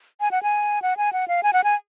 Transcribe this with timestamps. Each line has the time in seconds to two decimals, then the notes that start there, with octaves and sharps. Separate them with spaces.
0.21 G#5
0.31 F#5
0.43 G#5
0.82 F#5
0.97 G#5
1.13 F#5
1.28 F5
1.43 G#5
1.53 F#5
1.64 G#5